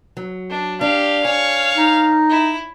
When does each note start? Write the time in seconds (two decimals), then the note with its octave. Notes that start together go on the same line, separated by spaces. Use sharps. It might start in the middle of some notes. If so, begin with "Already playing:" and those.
0.17 F#3
0.50 D4
0.81 D4 G4 F5
1.25 C#5 G#5
1.77 D#4
2.29 E4